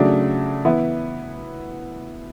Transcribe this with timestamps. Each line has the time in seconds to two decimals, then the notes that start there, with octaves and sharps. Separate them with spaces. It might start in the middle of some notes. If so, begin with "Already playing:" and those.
Already playing: C#3 F#3 A3 D4
0.65 E3 B3 E4